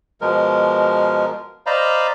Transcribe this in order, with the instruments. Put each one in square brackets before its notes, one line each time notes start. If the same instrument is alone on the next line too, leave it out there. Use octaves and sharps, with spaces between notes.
[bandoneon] B2 F3 G#3 A#4
C5 D5 D#5 F5 A#5 B5